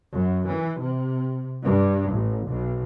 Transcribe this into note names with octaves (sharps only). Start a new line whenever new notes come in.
F#2
E3
C3
G2
A1
B1